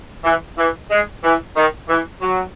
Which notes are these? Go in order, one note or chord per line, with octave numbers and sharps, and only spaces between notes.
E3
E3
G#3
E3
D#3
E3
F#3